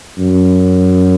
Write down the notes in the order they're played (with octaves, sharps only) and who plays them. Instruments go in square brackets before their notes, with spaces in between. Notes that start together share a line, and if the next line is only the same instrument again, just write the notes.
[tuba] F#2